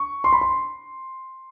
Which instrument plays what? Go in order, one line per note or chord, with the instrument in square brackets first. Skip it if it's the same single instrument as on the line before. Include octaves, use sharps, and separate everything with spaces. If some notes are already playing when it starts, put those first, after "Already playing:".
Already playing: [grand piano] C#6
C6
B5
C6